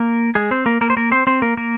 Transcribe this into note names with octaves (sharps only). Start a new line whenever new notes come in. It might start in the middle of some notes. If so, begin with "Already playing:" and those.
Already playing: A#3 A#4
G#3 G#4
C4 C5
A#3 A#4
A#3 A#4
C5
A#3 A#4
C4 C5
C4 C5
A#3 A#4
A#3 A#4